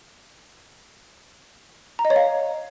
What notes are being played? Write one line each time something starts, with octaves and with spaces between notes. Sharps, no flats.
A#5
D#5
C#5
F5